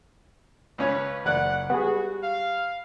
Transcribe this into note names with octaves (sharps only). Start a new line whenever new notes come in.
C#2 C#4 B4 C#5
F#1 D5 F#5 F#6
G3 B3 F#4 G#4
F5